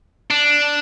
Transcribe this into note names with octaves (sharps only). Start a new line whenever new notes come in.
D4